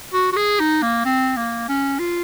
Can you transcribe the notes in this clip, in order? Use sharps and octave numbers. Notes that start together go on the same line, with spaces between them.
F#4
F#4
G#4
D#4
A#3
C4
A#3
C#4
F4